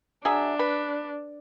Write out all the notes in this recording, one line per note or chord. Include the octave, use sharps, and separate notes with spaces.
F#3 D4 G#4 E5
B4